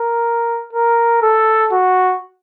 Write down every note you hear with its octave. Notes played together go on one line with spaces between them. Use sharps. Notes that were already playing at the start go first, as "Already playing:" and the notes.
Already playing: A#4
A#4
A4
F#4